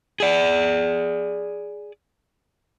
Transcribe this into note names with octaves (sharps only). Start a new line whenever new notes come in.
G#4 D5